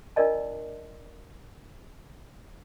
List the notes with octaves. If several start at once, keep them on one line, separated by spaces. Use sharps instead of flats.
D4 F4 A#4 D5 D#5 A5